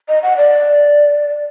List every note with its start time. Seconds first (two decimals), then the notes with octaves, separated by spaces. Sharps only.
0.09 D#5
0.23 F#5
0.37 D5